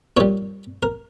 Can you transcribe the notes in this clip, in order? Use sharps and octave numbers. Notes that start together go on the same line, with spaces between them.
A#2 G3 C#5
A#4